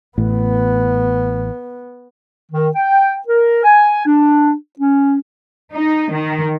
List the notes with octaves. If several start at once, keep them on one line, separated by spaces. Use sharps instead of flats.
A1 A2 B3
D#3
G5
A#4
G#5
D4
C#4
D#4
D#3